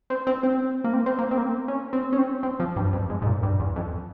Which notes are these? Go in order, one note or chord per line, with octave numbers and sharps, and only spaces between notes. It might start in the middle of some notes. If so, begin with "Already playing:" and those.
C4
C4
C4
A#3
C4
C4
A#3
C4
A#3
C4
C#4
C4
C#4
C4
C4
F3
G2
F2
G#2
G#2
A#2
G2
E2
F2